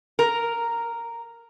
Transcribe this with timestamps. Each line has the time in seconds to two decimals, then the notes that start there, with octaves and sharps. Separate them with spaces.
0.19 A#4